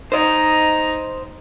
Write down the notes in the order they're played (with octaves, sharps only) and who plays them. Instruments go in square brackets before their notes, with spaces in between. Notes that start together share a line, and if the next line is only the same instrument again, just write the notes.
[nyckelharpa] D#4 A#5 [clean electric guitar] C5 D#5